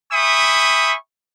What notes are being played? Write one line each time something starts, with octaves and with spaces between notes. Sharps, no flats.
E5 G5 G#5 B5 C#6 D#6